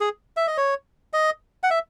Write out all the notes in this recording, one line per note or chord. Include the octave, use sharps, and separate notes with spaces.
G#4
E5
D#5
C#5
D#5
F#5
E5